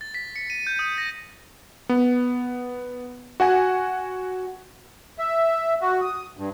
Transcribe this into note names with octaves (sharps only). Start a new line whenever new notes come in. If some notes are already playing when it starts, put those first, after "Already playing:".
A6
B6
C#7
D#7
G6
D#6
A#6
B3
F#4 F#5 G#5
E5
F#4
D#6
G2